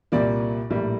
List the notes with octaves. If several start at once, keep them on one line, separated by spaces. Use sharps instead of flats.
C2 A#2 G3 A#3 D5
A#1 A2 G3 A#3